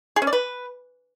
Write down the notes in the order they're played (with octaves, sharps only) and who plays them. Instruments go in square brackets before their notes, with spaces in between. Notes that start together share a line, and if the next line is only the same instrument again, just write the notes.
[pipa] G#4
C#4
D5
B4